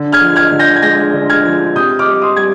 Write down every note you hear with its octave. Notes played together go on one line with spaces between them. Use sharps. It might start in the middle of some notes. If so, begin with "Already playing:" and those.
Already playing: D3
F6 G#6
F3
F6 G#6
D3
G6 A#6
G#6
G#3 G6 A#6
D3
F6 G#6
F3
C3 D#6 G6
D6 F6
G3
C6 D#6
G3 G#6